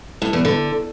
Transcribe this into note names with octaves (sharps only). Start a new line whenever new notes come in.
A2
E2
D3